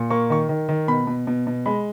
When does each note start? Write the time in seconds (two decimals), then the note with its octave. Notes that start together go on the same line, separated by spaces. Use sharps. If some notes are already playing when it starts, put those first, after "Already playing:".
Already playing: A#2
0.10 A#3 C#6
0.30 D#3 C#6
0.49 D#3
0.69 D#3
0.88 B2 B5
1.07 B2
1.27 B2
1.47 B2
1.66 G#3 B5